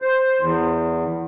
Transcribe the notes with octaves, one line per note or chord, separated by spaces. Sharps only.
C5
E2